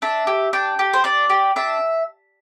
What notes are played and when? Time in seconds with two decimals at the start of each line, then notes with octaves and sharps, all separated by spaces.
0.02 D4 E5
0.27 G4
0.53 D4 G5
0.79 G4
0.93 C5
1.04 D4 D5
1.30 G4
1.56 D4 E5